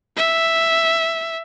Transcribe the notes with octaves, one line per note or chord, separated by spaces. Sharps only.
E5